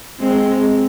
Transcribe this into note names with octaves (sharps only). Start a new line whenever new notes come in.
G#3 C4